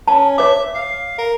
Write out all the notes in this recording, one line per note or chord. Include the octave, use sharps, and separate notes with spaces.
C#4 A5
C#5 E5 D6
F5
A#4